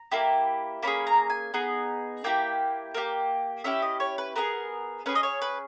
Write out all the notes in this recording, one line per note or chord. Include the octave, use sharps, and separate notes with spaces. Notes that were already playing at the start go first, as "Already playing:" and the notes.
Already playing: A#5
A#3 E4 G4
A#3 C#4 G#4 B5
A#5
G#5
B3 D#4 G#4
A#3 E4 G4 G5
A#3 D#4 G4
C#4 E4 G4 E5
D#5
C#5
B4
B3 D#4 G#4 A#4
C#4 G#4 B4
D#5
C#5
B4